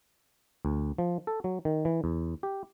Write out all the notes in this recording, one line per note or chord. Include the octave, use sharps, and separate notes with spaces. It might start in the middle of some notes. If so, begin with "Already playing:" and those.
D2
F3
A4
F#3
D#3
E3
E2
G4